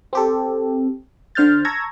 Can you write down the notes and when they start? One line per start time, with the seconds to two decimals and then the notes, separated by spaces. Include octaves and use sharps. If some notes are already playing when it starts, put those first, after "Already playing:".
0.13 C4 G4 A4
1.35 D3 C5 F6 G6 A6
1.65 A5 A#5 C#6 E6 G#6 A#6